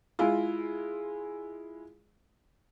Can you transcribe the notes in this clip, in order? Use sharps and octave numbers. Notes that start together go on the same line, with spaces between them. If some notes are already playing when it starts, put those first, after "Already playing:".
G#3 E4 F4